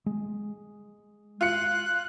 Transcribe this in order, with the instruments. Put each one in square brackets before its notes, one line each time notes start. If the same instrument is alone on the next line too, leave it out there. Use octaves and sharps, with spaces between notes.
[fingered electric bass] G#3
[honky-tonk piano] F4 C#7 [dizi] F#6